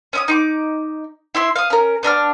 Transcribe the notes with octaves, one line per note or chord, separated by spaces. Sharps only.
C#4 E5 D#6
D#4 C#6 D6
E4 E5 C6
F5 D#6
C#4 A#4
B3 D4 A#5 F6